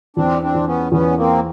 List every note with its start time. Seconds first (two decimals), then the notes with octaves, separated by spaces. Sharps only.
0.17 E2 C4 D4
0.42 C4 D4
0.54 E2
0.67 B3 C#4
0.92 E2 B3 C#4
1.18 A#3 C4